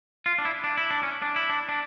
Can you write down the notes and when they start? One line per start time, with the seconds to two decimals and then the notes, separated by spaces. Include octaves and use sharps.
0.26 F4
0.38 D4
0.45 E4
0.64 D4
0.77 E4
0.91 D4
1.03 C#4
1.22 D4
1.36 E4
1.49 D4
1.69 D4